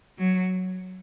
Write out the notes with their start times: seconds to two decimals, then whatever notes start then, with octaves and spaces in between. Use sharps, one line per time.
0.18 F#3